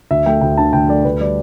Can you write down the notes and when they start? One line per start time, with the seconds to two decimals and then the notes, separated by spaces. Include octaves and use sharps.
0.11 D2 E5
0.26 A3 G5
0.41 D2 G5
0.58 D3 A5
0.73 D2 G5
0.89 A3 D5
1.05 D2 B4
1.20 G3 D5